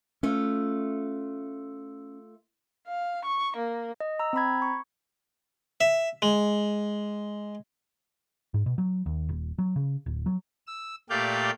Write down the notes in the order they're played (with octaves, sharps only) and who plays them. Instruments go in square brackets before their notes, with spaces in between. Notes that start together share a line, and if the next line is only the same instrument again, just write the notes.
[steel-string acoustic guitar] A3 F4 [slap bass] C#4
[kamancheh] F5
C#6
A#3
[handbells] D#5
A#5 E6
C4 A#5 B5 G#6
C#6
[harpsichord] E5
G#3
[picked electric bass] G#2
B2
F#3
D#2
D#1
F#3
C#3
D1
F#3
[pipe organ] E6
A#2 A3 G4 D5 F5 G6